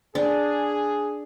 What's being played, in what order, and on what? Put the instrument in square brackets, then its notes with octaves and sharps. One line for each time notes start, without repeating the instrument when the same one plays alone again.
[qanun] D4 [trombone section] G#4